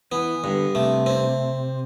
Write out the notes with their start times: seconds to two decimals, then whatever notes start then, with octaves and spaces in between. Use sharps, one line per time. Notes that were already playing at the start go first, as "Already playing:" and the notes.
0.12 E3 B3
0.44 G2 D3
0.75 C3 A3
1.06 C4